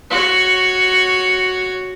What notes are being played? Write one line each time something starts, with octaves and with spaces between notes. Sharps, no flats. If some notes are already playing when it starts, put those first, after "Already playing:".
F#4 C#5